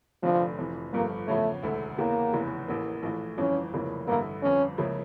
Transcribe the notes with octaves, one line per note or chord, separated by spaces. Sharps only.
F1 F2 D3 F3 A3 D4
F1 F2 E3
G1 G2 F3 A3 A#3
E2 C#3 F3 A3 C#4
E1 D2 D3 A3 E4
E2 C#3 E3 A#3
F1 E2 C#3 E3
A1 A2 E3 A#3
A#1 A2 E3 A3
G1 F2 E3 C#4
F1 F2 C#3 E3 A#3
A1 G2 D3 A3 A#3 E4
G1 F2 D3 C#4
C#2 C#3 F3 A#3 E4